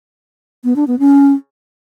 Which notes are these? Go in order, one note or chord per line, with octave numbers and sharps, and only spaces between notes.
B3
D4
B3
C#4